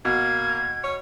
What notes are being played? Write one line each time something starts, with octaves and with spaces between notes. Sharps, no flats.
B2 A#3 G#6
C#5